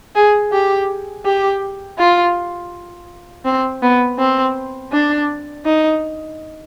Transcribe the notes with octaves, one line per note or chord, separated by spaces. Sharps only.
G#4
G4
G4
F4
C4
B3
C4
D4
D#4